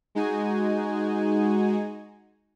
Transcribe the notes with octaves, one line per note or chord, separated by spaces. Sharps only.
G#3 D#4 F#4 G#5